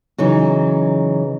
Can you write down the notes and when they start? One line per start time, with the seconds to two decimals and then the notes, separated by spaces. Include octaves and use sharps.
0.18 C#3 E3 F#3 D#4